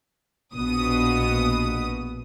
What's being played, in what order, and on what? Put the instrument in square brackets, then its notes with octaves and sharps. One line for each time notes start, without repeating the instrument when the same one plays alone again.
[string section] A#1 B2 B3 D#6